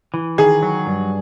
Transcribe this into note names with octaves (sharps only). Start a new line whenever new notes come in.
E3
D#3 G#4
F#3
G2